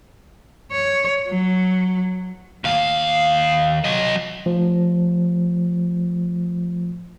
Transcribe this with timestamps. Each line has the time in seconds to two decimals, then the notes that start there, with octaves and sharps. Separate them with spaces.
0.72 C#5
1.28 F#3
2.64 D#2 F5
3.84 F#3 D#5
4.46 F3 A3